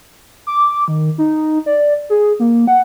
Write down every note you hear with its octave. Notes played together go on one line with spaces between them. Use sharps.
D6
D#3
D#4
D5
G#4
A#3
F#5